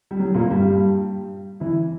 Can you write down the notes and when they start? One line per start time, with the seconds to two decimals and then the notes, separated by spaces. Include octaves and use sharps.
0.11 G3
0.20 F#3
0.34 A#2 A#3
0.50 G2 G3
1.60 E3 E4